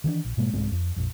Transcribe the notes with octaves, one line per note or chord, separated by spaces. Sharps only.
D#3 E3 A#3 D4
A#1
G#2 B2 G#3 A#3
C2 G#2 G#3 C4
F2
A#1 F2